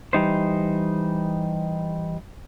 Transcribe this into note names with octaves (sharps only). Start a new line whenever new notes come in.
E3 G3 D#4 C5